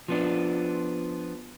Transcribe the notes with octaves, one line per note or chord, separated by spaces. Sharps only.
F3 B3 D4